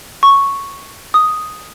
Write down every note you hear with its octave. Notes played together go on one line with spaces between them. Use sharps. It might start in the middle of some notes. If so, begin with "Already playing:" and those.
C#6
D#6